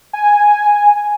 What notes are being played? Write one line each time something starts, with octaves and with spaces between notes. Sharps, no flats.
G#5